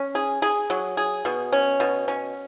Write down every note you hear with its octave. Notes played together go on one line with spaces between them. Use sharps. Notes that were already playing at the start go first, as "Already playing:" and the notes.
Already playing: C#4
G#4
G#4
F#3
G#4
B2
C#4
B2
C#4